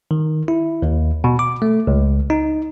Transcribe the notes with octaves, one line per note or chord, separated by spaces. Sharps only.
D#3
E4
D#2
B2
D6
A3
C#2
D#4